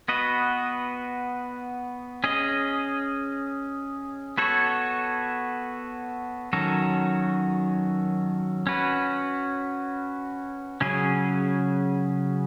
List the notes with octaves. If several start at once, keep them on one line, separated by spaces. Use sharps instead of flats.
B3 F#4 B4 D#5
C#4 G#4 D#5
B3 F#4 A4 C#5
D#3 F#3 C#4 F#4 A4
C#4 F#4 B4
C#3 F#3 C#4 G#4